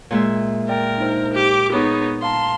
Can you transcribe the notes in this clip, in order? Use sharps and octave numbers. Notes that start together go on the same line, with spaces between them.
A#2 G#3 E5
A#4 D5 G5
D4 D#4 C5
G4 D6
B3 D#4 G#4 C#5 C#6
F5 A5 A#5 C6